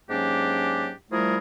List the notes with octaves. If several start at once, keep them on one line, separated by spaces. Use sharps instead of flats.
G#2 F#3 A#3 C#4 D4 G4
F3 G3 A3 E4 G#4 A#4